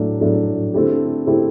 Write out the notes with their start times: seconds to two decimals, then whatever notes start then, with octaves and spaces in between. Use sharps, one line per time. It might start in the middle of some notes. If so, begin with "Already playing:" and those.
Already playing: A2 F#3 A3 D4
0.21 A2 F#3 A3 D4
0.74 D3 A3 C4 E4 G4
1.26 D3 A3 C4 E4 G4